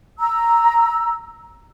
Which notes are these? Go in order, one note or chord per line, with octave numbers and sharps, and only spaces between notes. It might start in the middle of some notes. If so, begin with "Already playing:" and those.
A#5 E6